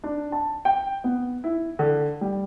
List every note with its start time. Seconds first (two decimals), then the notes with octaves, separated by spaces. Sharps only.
0.04 D4
0.32 A5
0.65 G5
1.04 B3
1.44 E4
1.79 D3
2.21 G3